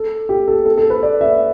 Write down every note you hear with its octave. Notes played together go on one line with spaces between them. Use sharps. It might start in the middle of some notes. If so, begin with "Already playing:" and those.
Already playing: A4
G4
A4
A4
A4
B4
D5
E5